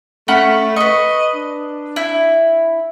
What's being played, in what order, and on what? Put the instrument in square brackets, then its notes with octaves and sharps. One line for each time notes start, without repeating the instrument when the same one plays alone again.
[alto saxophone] A3 [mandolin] C#4 F#5 B5
[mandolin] B4 C#6 [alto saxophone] D#5
[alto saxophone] D4
[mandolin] E4